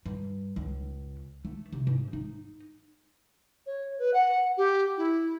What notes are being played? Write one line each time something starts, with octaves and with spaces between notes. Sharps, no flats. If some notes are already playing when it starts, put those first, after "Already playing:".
G2
C#2
A3
C3
G#2
D#4
C#5
B4
F#5
G4
E4